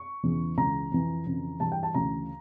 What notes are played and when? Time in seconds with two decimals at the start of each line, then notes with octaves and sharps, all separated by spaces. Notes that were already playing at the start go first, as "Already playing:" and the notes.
Already playing: C#6
0.23 E2 C#3 E3
0.57 C#2 C#3 E3 A#5
0.91 F2 E3
1.26 F2 C#3 E3
1.60 G2 E3 A5
1.72 G5
1.83 A5
1.94 D2 C#3 E3 A#5